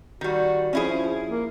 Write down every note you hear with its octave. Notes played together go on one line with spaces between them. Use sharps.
D#3 G3 F#4
F3 C#4 E4 G#4
A#3